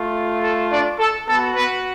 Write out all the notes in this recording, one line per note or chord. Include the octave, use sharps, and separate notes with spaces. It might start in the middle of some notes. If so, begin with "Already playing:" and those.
Already playing: A3 F4
A4
D4 D5
A4
B3 F#4 A4
B3 B4